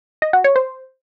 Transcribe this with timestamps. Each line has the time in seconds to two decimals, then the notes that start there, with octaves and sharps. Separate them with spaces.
0.22 D#5
0.33 F#4
0.44 C#5
0.56 C5